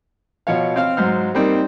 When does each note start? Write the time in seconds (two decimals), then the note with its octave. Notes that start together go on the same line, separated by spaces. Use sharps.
0.47 B2 F3 C#5 F5
0.76 C4 F5 F6
0.97 G#2 F#3 C5 F6
1.35 G3 A#3 C4 D#4